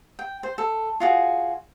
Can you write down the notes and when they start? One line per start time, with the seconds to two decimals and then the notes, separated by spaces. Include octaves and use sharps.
0.19 G5
0.43 C5
0.58 A4
1.00 F4 F#4 G#4